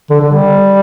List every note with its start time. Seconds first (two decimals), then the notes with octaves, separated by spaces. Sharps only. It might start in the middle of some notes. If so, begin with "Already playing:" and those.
0.10 D3
0.21 D3
0.32 G3